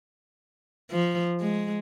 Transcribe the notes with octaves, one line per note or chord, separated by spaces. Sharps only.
F3
G#3